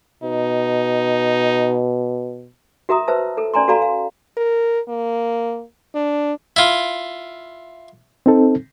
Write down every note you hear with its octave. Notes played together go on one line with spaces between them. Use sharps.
B2 D#4
F#4 A#4 E5 A#5 D#6
B4 C5 E5 A5 E6
A4 A#4
C#4 D5 G#5 A#5 C6
F#4 A4 D5 F5 A#5 B5
F5
A#4
A#3
D4
E4 F4
C4 D#4 A4